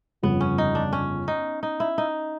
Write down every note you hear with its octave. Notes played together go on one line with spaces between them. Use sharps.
G1 F2 C#3 B3
C#4
D#4
D4
C#4
D#4
D#4
E4
D#4